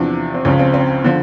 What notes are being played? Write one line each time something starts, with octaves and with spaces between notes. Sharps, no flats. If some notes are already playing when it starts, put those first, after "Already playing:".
Already playing: E2 C3 F3 D4
C4
C#2 C#3 F3 C#4
C4
C4
D3 F3